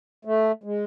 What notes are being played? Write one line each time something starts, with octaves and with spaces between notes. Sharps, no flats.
A3
G#3